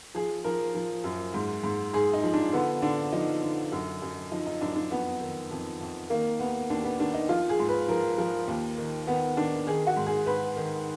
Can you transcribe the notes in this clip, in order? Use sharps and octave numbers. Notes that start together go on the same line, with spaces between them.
F3 G#4
F3 A#4
F3
F#2
G#2
G#2
G#2 G#4
D#4
F3
D4
D3 B3
D3 D4
F3 D#4
D3
F#2
F#2
F3 D#4
D#4
F#2 D4
D4
F2 B3
D#3
F2
F2
D#3 A#3
D#2 B3
D#2 D4
B3
D#3 D4
D#4
F3 F4
G#4
G#2
B4
F3 A#4
F3 A#4
D#2
D#3
D#3 B3
D#3 D4
D#3 G#4
F#4
G#2
G#4
G#2 B4
D#3